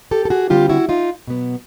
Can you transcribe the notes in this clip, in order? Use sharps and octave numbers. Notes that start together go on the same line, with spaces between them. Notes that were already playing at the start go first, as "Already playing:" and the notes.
G4 A4
A4
F#4 G#4
D3 G3 C4 F4 G4
E4 F#4
D#4 F4
B2 F#3 B3